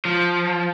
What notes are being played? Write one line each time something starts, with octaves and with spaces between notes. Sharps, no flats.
F3